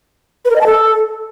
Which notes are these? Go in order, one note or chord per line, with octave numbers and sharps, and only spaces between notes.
B4
A#4
D#5
A5
A4